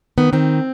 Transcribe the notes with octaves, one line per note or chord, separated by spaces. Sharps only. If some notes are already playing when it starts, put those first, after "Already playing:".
D#3 B3
D#3 C4